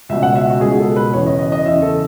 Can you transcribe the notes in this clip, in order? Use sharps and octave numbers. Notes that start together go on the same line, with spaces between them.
C#2 B2 F#3 E5
F#5
E5
F#4
C#2 B2 F#3 G#4
A4
B4
E2 C#3 E3 C#5
D#5
D#5
D#5
E2 C#3 E3 E5
A4